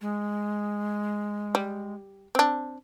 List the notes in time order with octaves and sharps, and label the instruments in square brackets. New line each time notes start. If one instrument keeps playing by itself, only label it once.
[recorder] G#3
[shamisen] G3
C4 D4